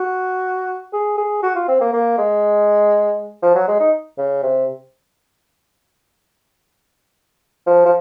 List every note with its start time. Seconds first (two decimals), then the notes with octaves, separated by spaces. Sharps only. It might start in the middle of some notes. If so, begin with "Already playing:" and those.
Already playing: F#4
0.93 G#4
1.18 G#4
1.43 F#4
1.55 F4
1.68 C4
1.80 A#3
1.93 A#3
2.18 G#3
3.42 F3
3.55 F#3
3.68 G#3
3.80 D#4
4.18 C#3
4.43 C3
7.67 F3
7.85 F3